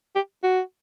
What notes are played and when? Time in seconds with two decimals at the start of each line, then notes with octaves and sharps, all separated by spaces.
0.15 G4
0.43 F#4